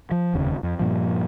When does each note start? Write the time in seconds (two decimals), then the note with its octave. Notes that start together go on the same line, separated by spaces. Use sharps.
0.11 F3
0.34 F1 D#2 C#3
0.63 F2
0.79 G2 A#2 F3